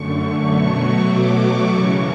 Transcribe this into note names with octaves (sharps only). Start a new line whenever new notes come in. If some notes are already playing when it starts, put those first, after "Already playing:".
Already playing: F#2 D3 A3 C#6
C#6
B2 F#3 A3 C#6
B2 F#3 A3 D6
C#6
F#2 C#3 E3